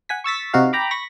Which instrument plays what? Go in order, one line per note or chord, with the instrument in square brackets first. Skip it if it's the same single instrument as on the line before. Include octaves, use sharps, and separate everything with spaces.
[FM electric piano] F#5 G#5 B6
C#6 E6 A6 B6
C3 D#4 F#4 F5
G5 A#5 B5 D6
B5 C#6 A#6